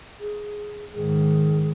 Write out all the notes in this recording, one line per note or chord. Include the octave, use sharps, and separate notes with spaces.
G#4
G#2 D#3 G#4